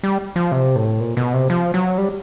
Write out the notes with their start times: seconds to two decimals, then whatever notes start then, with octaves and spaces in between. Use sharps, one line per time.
0.03 G3
0.36 F3
0.52 C3
0.76 A2
1.00 A#2
1.17 B2
1.33 C3
1.50 F3
1.74 F#3
1.98 G3